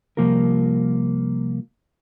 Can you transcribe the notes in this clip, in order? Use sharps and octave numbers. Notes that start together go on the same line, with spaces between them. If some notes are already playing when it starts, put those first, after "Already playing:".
C2 F2 F3 A#3 F4 A#4